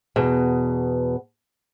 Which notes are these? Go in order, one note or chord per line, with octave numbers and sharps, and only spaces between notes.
E2 B2